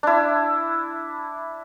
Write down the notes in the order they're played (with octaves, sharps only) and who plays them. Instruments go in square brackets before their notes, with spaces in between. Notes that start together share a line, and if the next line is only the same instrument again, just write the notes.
[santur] D4 E4